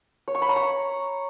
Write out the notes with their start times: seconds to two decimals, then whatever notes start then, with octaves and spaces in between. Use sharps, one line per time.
0.28 C#5
0.35 C#6
0.42 B5
0.49 A#5
0.56 C#6